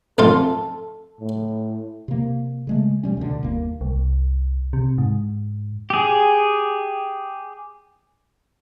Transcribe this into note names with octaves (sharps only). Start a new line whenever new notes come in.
A1 F2 F4 A4
A2
C3 A#3
C#3 G#3 A3
C3 G3 C#4
D2 B2 D3
G1 D#2 A#3
C2
C3
G#2
G4 G#4